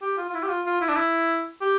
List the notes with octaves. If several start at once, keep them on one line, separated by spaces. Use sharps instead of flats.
G4
F4
F4
E4
G4
F4
F4
E4
D4
E4
G4